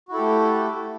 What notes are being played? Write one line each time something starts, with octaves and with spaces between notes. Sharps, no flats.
A3 E4 F#4 G4 A4